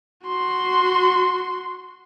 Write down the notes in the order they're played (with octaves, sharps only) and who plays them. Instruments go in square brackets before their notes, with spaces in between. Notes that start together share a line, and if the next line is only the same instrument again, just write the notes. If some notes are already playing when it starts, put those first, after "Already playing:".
[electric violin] F#4 C6